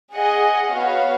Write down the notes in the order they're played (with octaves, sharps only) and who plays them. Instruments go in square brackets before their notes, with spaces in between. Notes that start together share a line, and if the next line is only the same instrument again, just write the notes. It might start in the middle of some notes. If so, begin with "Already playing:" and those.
[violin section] G#4 D#5 F#5
B3 F#4 C#5 F5